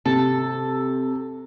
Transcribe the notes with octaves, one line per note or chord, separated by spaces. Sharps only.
C3 A4